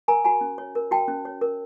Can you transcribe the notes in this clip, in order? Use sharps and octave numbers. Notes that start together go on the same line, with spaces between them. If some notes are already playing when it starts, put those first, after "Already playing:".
A#4 G#5 A#5
F#4 G#5 A#5
C#4
C#5
A#4
F#4 G5 A5
C#4
C#5
A#4